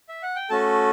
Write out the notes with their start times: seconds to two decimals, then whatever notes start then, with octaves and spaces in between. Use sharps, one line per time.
0.09 E5
0.23 F#5
0.36 G5
0.50 A3 C#4 F#4 A4 A5